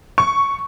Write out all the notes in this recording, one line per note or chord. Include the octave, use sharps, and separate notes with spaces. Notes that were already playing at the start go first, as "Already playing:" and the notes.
C#6